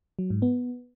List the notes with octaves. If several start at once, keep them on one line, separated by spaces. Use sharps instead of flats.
F#3
G#2
B3